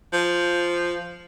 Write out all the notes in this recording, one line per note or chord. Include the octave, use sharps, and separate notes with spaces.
F3